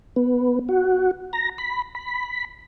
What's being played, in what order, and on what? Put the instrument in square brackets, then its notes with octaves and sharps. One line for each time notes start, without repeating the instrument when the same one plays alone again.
[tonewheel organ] B3
F#4
A#5
B5
B5